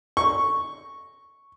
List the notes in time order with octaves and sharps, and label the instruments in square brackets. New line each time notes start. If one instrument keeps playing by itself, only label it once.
[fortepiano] C#6